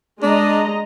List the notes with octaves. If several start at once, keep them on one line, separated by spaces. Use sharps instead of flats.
G#3 D4 D#5 A#5